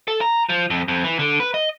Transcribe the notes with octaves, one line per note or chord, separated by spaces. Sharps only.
A4
A#5
F3
F2
F2
E3
D3
B4
D#5